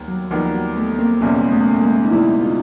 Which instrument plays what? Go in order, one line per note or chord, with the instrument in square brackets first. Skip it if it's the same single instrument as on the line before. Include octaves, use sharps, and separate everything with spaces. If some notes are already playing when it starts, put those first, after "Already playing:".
Already playing: [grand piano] D#2 D#3 G3 B3
[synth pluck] F#3
[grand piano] D#2 D#3 G3 B3 [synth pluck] F3
[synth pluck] F#3
A3 B3
A#3 C4
[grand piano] F#1 E2 B2 G3 [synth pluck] B3 C#4
[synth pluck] A3 B3
G#3 A#3
D#4
[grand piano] F#1 E2 B2 G3 [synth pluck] D4 E4
[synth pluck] D#4 F4